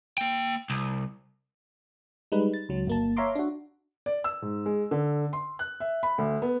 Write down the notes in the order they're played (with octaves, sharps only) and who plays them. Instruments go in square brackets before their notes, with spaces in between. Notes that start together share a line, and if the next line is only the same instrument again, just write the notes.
[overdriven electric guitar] A#3 G5
C2
[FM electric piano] G3 G#3 D#4 B4
A6
C#2 F#3
G1 A#3 A5
C#5 E5 F5 A#5 C6 D6
D4 F#4
[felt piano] D5
E6
G#2
G#3
D3
C6
F#6
E5
B5
D2
B3